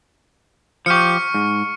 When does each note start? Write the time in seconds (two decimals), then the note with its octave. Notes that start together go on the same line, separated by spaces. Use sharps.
0.86 F3 G4 C#6 F6 C#7
1.34 G#2